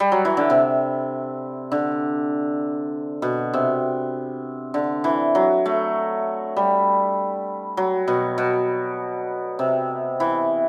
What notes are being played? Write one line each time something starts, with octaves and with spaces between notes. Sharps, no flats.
G3
F#3
E3
D3
C3
D3
B2
C3
D3
E3
F#3
A3
G3
F#3
B2
B2
C3
E3